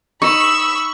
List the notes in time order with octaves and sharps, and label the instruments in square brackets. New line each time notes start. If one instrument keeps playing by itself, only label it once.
[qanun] D#4 [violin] B5 E6 [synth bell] C#6